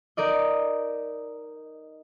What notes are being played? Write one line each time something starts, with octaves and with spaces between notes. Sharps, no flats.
D#4 A#4 D5 D#5